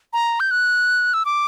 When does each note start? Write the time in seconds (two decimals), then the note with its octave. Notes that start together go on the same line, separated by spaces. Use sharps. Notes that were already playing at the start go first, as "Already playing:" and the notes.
0.13 A#5
0.40 G6
0.51 F#6
1.14 E6
1.26 D6